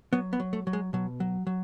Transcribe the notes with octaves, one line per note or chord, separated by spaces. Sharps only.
F#3 B3
B3
F#3
A3
F#3
G#3
B2 F#3
F#3
F#3